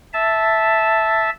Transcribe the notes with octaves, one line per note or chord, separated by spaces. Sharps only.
E5 A5